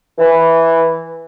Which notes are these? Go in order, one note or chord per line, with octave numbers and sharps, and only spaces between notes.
E3